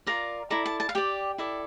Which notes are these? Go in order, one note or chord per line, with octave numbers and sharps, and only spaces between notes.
F4 A#4 D5 A#5
E4 A4 D5 A#5
A5
A5
F5
G4 D5 G5
E4 A4 D5